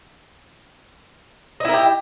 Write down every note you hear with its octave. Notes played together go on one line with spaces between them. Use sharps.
E4 G4 A#4 D#5